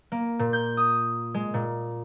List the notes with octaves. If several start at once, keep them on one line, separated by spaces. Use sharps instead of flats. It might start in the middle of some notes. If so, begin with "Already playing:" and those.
A#3
A#2
G6
D#6
G#3
A#2